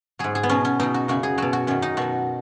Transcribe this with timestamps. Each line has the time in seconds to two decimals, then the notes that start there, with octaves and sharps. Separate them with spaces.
0.19 G#2 F#3 G#4
0.35 G#4
0.43 B3
0.49 B2 F#3 C#4
0.65 C#4
0.80 B2 F#3 D#4
0.94 F#4
1.08 F#2 C#3 F#3 F#4
1.23 G#4
1.38 B2 F#3 F#4
1.53 F#4
1.67 F#2 D#3 F#3 C#4
1.82 D#4
1.97 B2 F#3 F#4